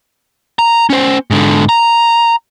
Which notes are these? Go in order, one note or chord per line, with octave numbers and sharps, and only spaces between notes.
A#5
C#4 C5
G#2 D3
A#5